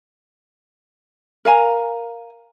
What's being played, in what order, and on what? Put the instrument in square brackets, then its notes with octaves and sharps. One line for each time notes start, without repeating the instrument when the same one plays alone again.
[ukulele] A#4 F5 G#5 A#5